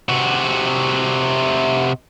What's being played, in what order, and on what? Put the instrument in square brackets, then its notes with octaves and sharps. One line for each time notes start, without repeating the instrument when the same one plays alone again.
[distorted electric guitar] C3 F#4